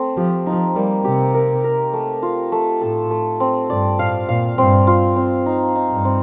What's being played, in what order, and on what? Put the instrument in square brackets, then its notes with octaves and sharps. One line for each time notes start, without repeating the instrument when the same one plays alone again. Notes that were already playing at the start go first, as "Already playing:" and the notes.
Already playing: [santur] A3 C4
[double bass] F3 [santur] G4
[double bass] F3 [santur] D#4
[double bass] G3 [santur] A#3
[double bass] C3 [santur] G4
[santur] A#4
A#4
A3
F4
A3
[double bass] A2 [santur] A4
[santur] A3
C4
[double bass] G2 [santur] D5
[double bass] A2 [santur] F5
[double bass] A#2 [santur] F5
[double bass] G2 [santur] C4
[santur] F4
C4
D#4
D#4
[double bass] G2
[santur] C4